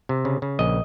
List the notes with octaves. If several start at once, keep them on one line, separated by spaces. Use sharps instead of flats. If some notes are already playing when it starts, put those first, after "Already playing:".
C3
C#3
C#3
A#1 D#5